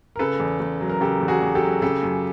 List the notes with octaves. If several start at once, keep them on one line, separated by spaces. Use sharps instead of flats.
A#4
C#3 A4 B4
E2
E2
F#3
A#4
C#3 G4 A4
E2
F#4 G#4
E2
G4 A4
F#3
C#3 G4 A4
F#2